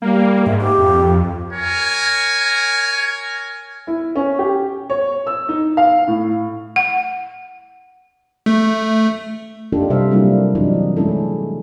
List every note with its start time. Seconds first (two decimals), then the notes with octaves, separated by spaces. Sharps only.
0.02 G3 A#3
0.47 G#2 E5
0.61 G4
0.78 F2
1.52 A#4 C#5 G#5
3.87 E4
4.16 C#4
4.39 G4
4.90 C#5
5.27 E6
5.49 D#4
5.77 F5
6.07 A2
6.76 F#5
8.46 A3
9.72 A#3 D4 D#4 F4 G4 A4
9.90 C3 G3 C5 E5 F5
10.11 F#3 G3 A#3 D4 E4 F4
10.55 E3 F#3 C4 D4 D#4
10.97 G#3 A3 C#4 E4 A4